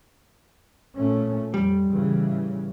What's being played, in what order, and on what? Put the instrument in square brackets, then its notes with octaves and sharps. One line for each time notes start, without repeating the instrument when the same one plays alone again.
[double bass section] A#2 A3 C#4
[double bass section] F2 [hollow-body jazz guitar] G3
[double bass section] A2 C#3 E3